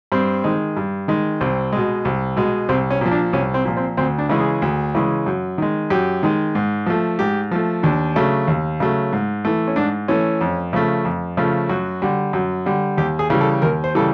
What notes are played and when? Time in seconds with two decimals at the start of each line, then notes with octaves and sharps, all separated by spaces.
0.12 G2 C4
0.44 D#3 G#3
0.77 G2
1.08 D#3 G#3
1.41 C2 C4
1.72 B2 G#3
2.05 C2
2.37 B2 G#3
2.69 C2 C4
2.91 C#4
3.01 A#2 F3
3.11 D4
3.33 C2 C#4
3.54 C4
3.65 A#2 F3
3.77 C4
3.97 D2 C4
4.18 D4
4.29 C#3 E3 G#3
4.40 G#4
4.62 D2
4.95 C#3 E3 G#3
5.26 F#2
5.58 D#3 G#3
5.90 F#2 G4
6.23 D#3 G#3
6.55 G#2
6.86 F3 A3
7.19 G#2 G4
7.51 F3 A3
7.83 D#2 D4
8.16 C#3 F#3 A3
8.48 D#2
8.80 C#3 F#3 A3
9.12 G#2
9.45 E3 A3
9.67 C#4
9.76 G#2 D4
10.08 E3 A3 C#4
10.41 F2
10.73 C#3 F3 A3
11.05 F2
11.37 C#3 F3 A3
11.69 F#2 F#4
12.02 D3 G3
12.33 F#2
12.66 D3 G3
12.97 D#2 G4
13.19 G#4
13.30 C#3 E3 G3
13.41 A4
13.62 D#2 A#4
13.84 C5
13.95 C#3 E3 G3 A4